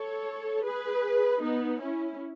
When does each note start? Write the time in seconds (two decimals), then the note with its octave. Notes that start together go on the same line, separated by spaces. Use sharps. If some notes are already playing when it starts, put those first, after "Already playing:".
Already playing: A4 C#5
0.64 G#4 B4
1.42 B3 D#4
1.80 C#4 E4